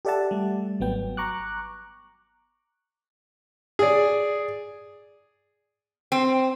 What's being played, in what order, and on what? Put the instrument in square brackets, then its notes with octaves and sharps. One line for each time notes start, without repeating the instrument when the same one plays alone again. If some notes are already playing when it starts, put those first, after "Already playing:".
[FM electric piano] G4 A4 D5 E5 F#5 A5
G3 A3
G#1 F#3 B3 G5
A#5 C#6 D6 F#6
[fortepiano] G#4 D5
[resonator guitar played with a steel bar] C4